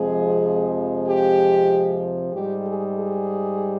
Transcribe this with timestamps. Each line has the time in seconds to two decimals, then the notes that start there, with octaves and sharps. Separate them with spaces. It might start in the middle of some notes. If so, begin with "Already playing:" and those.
Already playing: F2 C3 F3 G#3 G#4
1.07 G4
2.33 G#2 G3 G4
2.65 G#4
2.96 G#4